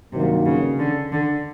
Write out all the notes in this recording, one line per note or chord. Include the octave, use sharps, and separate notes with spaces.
G2 C3 D#3 F#3 A#3
C#3
D3
D3